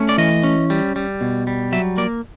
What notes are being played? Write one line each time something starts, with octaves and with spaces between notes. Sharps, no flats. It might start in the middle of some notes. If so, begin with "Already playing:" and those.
Already playing: A3 C#4
D5
E3 D#5
C#4
G3
G3
B2
G3
F#3 E5
A#3 D5